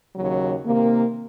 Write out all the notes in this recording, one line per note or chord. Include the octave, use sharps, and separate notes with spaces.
D#2 C#3 F#3
C3 D#3 A#3